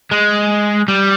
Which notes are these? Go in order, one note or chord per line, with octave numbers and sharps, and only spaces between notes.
G#3
G3